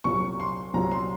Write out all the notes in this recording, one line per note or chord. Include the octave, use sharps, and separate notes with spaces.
C2 A#2 F#3 C#6
C6
C2 A#2 F#3 A#5
C6